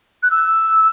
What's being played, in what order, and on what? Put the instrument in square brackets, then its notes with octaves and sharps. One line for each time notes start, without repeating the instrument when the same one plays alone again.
[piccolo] F#6
E6